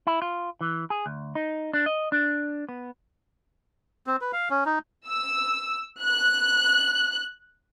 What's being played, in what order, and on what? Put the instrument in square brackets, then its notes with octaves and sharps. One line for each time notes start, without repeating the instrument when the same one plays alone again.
[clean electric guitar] E4
F4
E3
G#4
D2
D#4
D4
D#5
D4
B3
[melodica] C4
B4
F5
C#4
D#4
[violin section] E6
F#6